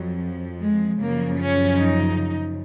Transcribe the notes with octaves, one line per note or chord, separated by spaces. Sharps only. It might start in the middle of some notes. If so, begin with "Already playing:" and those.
Already playing: F2 F3 F#3
G#3
F#2 C#3 F3 A#3
C#4
D#4